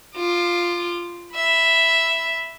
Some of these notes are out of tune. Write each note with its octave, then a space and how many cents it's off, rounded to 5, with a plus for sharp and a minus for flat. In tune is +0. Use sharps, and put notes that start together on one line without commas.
F4 +0 D6 +35
E5 +0 B5 +0